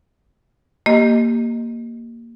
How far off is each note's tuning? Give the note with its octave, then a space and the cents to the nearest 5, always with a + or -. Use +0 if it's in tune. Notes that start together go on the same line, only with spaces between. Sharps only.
A#3 -5 G4 +0 D#5 +0